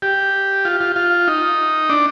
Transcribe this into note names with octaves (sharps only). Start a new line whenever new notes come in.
G4
F4
F4
F4
D#4
D4